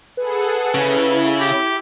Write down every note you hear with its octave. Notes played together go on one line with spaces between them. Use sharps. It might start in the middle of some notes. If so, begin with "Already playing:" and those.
G#4 A4 B4 F#5
C#3 E4
G4